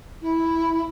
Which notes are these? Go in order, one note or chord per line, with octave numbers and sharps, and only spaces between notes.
E4